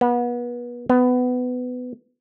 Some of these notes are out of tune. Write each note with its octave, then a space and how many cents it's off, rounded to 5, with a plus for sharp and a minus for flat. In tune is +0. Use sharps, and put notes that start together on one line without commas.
B3 -30
B3 +20